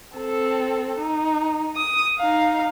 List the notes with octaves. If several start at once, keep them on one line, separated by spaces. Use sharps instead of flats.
C4 A4
D#4
D#6
D#4 F5